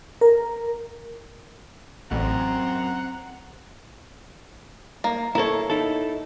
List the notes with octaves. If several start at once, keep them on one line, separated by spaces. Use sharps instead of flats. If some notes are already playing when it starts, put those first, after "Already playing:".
A#4
A1 F#2 C4 F#5 A#5
A#3
A#3 E4 A4 C#5
D#4 E4 A4